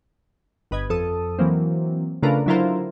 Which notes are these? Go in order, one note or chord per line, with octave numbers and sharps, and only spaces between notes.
G1 B4 D#5 G#6
F2 A4 D#6
E3 F#3 A#3 C4
C#3 A3 D4 F4 A#4 B4
D3 F#3 E4 F4 A#4 C5